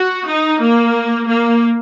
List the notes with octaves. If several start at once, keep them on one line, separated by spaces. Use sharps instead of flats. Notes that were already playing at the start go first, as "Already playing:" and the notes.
Already playing: F#4
D#4
A#3
A#3